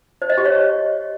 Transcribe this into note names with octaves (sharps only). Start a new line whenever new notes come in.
C5
D#5
G4
C#5